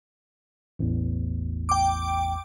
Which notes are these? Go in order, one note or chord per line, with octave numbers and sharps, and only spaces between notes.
A1 E2
G5 D6